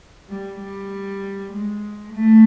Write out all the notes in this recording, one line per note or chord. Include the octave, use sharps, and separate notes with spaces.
G3
G3
G#3
A3